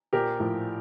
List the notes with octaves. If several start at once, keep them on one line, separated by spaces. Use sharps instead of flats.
A#1 G4 A#4
A2 F3